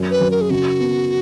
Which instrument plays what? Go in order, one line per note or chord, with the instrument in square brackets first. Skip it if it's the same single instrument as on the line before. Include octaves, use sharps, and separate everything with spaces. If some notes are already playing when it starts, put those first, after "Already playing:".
Already playing: [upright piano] F#2 C#4
[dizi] B4
[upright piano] F#3
[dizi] A#4
G#4
[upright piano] C#3 [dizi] F#4
[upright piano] B3